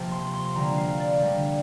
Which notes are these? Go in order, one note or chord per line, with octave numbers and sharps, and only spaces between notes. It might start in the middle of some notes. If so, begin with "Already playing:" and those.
Already playing: C3 F3 A#3 C5
C6
C6
D3 G3 A#3 A#5
F5
D5
D3 G3 A#3